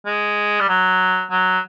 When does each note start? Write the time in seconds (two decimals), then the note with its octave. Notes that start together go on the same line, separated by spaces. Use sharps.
0.06 G#3
0.60 G3
0.69 F#3
1.31 F#3